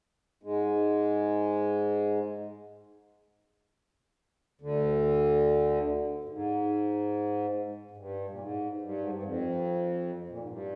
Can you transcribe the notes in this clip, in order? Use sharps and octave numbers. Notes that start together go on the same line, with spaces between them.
G#2 G#3
D2 D3
G2
G#2
G#2
G2
A#2
G#2
G2
G#2
G2
F2
A#2
G#2
G2